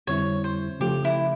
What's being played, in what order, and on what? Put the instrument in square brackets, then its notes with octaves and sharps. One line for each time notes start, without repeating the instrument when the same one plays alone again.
[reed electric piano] F2 D3 G3 C4 E4 [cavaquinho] C#5
[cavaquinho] C5
[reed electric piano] C#3 F3 A3 [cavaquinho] G4
[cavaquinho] E4